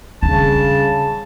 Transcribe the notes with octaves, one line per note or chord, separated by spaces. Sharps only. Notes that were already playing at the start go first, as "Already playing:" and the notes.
C#3 G3 D4 A5